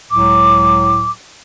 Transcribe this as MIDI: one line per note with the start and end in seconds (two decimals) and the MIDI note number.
0.11 1.10 37
0.11 1.10 45
0.11 1.10 54
0.11 1.10 86